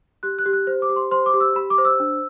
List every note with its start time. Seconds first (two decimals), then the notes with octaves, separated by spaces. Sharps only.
0.23 G4 F#6
0.39 F#6
0.46 G4
0.53 F#6
0.67 C5
0.82 D6
0.89 G4
0.96 C6
1.11 C5 C6
1.26 D6
1.34 G4
1.40 E6
1.55 G4 B5
1.70 D6
1.78 C5
1.85 E6
2.00 D4